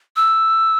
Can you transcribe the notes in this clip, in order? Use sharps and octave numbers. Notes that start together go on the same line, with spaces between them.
E6